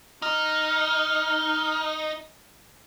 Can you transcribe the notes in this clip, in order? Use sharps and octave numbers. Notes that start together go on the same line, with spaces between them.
D#4 F6